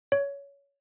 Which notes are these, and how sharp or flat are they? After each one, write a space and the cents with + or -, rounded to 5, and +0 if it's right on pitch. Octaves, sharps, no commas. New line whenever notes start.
C#5 +20